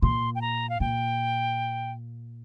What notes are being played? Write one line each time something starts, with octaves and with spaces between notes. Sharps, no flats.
A#2 C6
G5
A#5
F5
A#2 G5